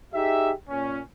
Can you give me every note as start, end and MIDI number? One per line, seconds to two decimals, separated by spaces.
0.14 0.51 63
0.14 0.51 67
0.14 0.51 68
0.14 0.51 76
0.69 1.00 46
0.69 1.00 61